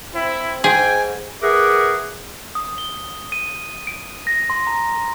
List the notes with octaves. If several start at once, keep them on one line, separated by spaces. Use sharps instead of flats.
C4 E4
G#2 G#4 G5 G#5
G#4 A#4 B4 E5 F#5 D6
D#6
G7
D#7
D7
A#6
C6
A#5